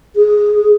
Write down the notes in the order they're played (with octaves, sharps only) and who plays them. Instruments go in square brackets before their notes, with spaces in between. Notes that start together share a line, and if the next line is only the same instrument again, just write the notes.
[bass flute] G#4